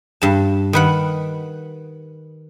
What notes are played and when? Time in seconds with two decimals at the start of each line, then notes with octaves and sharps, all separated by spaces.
0.22 G2 A5
0.73 D#3 B4 F#5